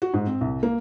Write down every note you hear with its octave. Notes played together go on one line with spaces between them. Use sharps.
F#4
G#2
C4
C2
A#3